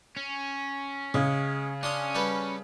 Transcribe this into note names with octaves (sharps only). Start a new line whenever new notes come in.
C#4
C#3 G#3
C#4 D4 C6 D#6
G3 A4 B4